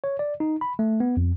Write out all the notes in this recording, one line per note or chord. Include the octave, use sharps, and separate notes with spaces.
C#5
D5
D#4
B5
A3
B3
F2